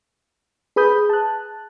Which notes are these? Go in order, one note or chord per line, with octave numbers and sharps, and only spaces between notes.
G#4 B4 B5 D#6 G6
A5 F#6